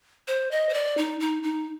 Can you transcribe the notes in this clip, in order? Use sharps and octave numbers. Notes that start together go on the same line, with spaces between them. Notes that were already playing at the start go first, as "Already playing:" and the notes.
C5
D#5
C5
D5
D#4
D#4
D#4